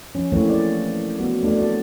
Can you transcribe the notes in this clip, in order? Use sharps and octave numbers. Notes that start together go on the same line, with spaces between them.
F3 C#4
E3 A3 A#3 C4 C#4 C#5
D5
F#3 B3
A3 D4 D5
C4 F#4 D5